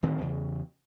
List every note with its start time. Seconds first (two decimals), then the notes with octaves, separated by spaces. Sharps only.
0.03 D1 D2 D#3 C4
0.21 E2 C#3